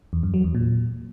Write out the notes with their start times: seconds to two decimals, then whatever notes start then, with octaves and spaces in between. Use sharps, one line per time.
0.13 E2
0.23 F#2
0.34 F#3
0.44 E2
0.55 A#2